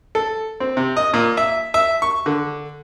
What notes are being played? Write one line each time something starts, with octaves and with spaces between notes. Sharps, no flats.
A4
C4
C3
D#5
A#2
E5
E5
C#6
D3